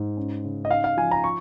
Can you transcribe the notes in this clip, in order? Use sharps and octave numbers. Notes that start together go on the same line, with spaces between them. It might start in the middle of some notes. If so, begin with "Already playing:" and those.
Already playing: G#2
C#4
C#3
D#5
D#4 F5
F5
F3 G#5
A#5
C#6